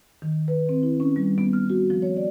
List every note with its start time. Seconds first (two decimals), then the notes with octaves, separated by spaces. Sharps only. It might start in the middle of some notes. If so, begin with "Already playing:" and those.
0.22 D#3
0.48 B4
0.69 C4
0.83 E4
1.00 C#4
1.16 G3
1.38 B3
1.53 F6
1.70 F#4
1.90 F3
2.02 C#5
2.16 D5